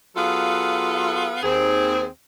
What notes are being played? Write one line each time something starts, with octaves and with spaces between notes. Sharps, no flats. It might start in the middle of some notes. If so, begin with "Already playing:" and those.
F#3 B3 F4 G#4 A4 F5
D#2 C4 G#4